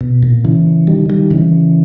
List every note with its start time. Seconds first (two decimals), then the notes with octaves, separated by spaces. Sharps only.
0.01 B2
0.23 A#2
0.45 C#3 E3
0.87 D#3 G3
1.10 D#3 G3
1.31 C#3 E3